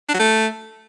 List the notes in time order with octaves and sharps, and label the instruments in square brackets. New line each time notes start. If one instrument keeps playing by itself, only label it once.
[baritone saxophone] D4
F#3
A3